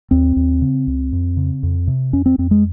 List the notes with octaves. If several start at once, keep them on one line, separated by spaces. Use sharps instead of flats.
D#2 C4
D#2
C#3
C#2
F2
C#3
F2
C3
F2 C#4
C4
F2 C4
G#3